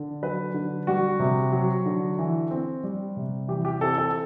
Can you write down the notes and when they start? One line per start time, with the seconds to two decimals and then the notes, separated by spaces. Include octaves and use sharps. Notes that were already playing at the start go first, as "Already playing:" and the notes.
Already playing: D3
0.22 F#3 B4
0.54 D3
0.87 G3 F#4
1.20 C3
1.52 F#3
1.86 D3
2.19 E3
2.51 C4
2.84 G3
3.17 C3
3.48 E3 G4
3.65 G4
3.81 C4 A4
3.98 A4